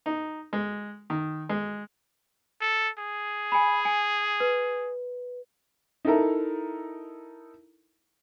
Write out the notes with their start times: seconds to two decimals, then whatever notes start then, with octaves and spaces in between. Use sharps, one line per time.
0.06 D#4
0.53 G#3
1.10 D#3
1.49 G#3
2.61 A4
2.98 G#4
3.52 G#5 B5
3.85 G#5
4.40 B4
6.05 D#4 E4 A4 A#4 A#5